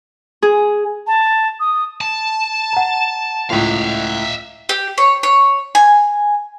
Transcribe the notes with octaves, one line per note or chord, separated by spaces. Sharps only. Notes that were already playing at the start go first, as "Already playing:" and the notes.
G#4
A5
D#6
A5
F#5 A#5
C#2 A2 E5 F5
G4
C#5
C#5
G#5